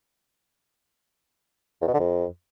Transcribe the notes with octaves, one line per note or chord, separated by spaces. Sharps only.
E2
B2
D3
F2